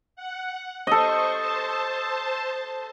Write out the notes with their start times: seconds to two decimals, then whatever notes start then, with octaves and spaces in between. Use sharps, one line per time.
0.16 F#5
0.87 A4 C5 D#5 C#6
1.39 C5 A5